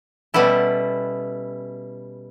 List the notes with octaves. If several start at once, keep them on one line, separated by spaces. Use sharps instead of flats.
B2 G3 B3 C#4 E4 A4